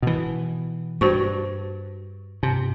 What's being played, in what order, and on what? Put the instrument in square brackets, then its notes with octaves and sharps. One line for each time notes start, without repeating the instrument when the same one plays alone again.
[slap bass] B2 E3
[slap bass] G2 [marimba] F#4 C5 C#6
[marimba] G2 [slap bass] C3